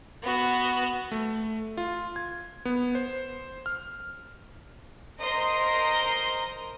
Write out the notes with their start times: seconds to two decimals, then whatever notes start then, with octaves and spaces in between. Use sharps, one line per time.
0.23 B3 F#4
1.12 A3
1.77 F4
2.16 G#6
2.65 B3
2.95 C5
3.66 F6
5.20 A#4 C5 D#5 A#5 C6